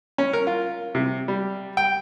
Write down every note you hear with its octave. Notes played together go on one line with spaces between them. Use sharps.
C#4
A#4
F4
C3
G3
G5